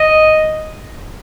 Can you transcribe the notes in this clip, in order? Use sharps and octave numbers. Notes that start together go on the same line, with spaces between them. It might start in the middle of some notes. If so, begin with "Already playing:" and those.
Already playing: D#5